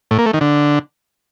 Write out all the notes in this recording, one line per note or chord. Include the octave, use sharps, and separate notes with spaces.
A2
A#3
A3
D#3
D3